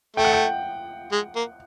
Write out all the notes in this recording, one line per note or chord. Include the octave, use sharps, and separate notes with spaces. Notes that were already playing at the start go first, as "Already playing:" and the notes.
A3 G5
F#5
G5
G#3
A#3